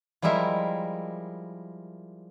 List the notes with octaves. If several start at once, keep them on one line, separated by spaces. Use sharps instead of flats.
F3 G3 G#3 E4 A#4 E5